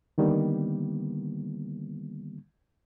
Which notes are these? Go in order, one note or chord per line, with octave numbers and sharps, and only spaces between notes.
D3 D#3 G3 A#3 B3